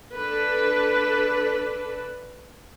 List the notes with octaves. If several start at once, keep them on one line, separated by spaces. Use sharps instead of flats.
D4 A4 B4